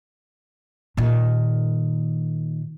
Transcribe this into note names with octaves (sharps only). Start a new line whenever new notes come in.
A#2 D#3